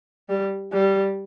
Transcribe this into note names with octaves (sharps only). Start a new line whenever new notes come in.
G3
G3